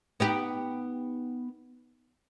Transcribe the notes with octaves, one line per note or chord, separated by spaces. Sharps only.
B3 D#4 G4